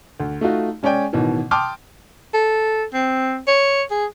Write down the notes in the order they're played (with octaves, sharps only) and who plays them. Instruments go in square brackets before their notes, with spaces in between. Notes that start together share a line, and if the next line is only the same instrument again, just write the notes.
[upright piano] D2
A3 D#4 F4 F#4
G#3 C#4 C#5 D5 G5 G#5
A1 B2 D#3 E3
G5 A5 C6 D6 D#6 F6
[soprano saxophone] A4
C4
C#5
G#4